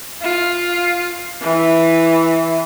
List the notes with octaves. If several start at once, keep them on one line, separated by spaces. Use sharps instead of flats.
F4
E3